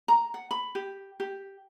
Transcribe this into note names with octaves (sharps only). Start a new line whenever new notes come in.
A#5
F#5
B5
G4
G4